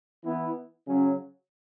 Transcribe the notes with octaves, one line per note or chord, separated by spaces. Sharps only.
E3 B3 E4
C#3 F#3 C#4